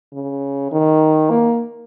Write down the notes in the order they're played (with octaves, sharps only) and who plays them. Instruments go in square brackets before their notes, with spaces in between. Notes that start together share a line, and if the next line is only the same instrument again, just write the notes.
[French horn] C#3
D#3
A#3